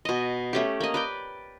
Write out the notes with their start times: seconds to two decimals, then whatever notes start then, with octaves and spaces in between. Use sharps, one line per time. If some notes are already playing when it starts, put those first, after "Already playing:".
0.05 B2 D#5
0.53 A3 C#4 G4
0.80 A#3 D#5
0.94 B4 D5 G5